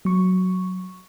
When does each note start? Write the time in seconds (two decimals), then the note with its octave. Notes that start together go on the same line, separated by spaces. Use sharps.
0.05 F#3 C#6